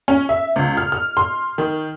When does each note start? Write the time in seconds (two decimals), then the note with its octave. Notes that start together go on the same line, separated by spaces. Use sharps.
0.08 C#4
0.29 E5
0.56 C#2
0.77 F6
0.92 F6
1.17 C6
1.58 D#3